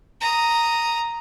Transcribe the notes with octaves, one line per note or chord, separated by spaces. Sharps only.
A#5 D#6